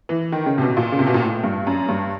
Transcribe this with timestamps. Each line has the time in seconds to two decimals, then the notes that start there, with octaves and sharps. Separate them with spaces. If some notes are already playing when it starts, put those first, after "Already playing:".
0.09 E3
0.32 D#3
0.46 C#3
0.58 C3
0.61 B2
0.77 A#2
0.92 C#3
0.99 C3
1.07 B2
1.14 A#2
1.22 A2
1.44 G2
1.67 F#2
1.89 G2